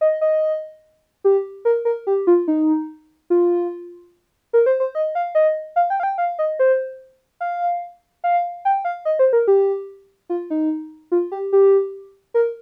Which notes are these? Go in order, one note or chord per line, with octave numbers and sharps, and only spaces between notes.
D#5
D#5
G4
A#4
A#4
G4
F4
D#4
F4
A#4
C5
C5
D#5
F5
D#5
F5
G5
F5
G5
F5
D#5
C5
F5
F5
G5
F5
D#5
C5
A#4
G4
F4
D#4
F4
G4
G4
A#4